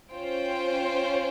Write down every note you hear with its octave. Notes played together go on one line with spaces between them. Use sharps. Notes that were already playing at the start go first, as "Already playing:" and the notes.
C#4 F4 C5 G5